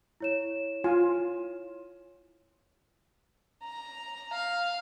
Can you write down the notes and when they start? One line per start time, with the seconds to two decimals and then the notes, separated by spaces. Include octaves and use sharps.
0.20 E4 C#5 E7
0.84 F4 G#5
3.63 A#5
4.33 F5